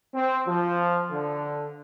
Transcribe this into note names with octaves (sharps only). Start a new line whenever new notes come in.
C4
F3
D3